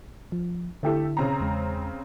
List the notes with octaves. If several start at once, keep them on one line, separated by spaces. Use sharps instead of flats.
F3
D3 A3 E4 G4 A4
C#3 C4 A#5
E2 G#3